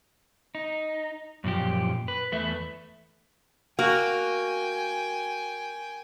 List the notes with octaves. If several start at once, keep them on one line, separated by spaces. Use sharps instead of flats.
D#4
F#2 A#2 F3 G4
B4
E2 A3 B4 E5
A#3 F#4 G5 G#5